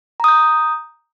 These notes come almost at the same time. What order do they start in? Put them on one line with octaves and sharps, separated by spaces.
A#5 D#6 G6